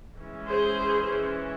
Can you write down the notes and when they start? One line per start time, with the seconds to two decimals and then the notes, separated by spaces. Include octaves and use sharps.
0.17 E3 G#3 C#4
0.46 G#4 C5